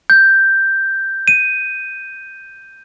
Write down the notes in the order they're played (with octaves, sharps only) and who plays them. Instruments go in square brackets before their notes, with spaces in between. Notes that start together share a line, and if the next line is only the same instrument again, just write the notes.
[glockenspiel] G6
D#7